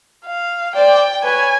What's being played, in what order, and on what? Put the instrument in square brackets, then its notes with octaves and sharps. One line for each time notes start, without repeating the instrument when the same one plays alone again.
[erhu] F5
[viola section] C5 D5 [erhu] G5
[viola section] B4 C#5 [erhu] G#5